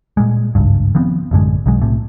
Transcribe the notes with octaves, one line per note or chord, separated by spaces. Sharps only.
A#2 G3 G#3
G#1 C#2 G2
D#3 F3 B3 C4
A1 F#2 D3 G#3
B1 B2 F#3 G#3
B1 A2 C3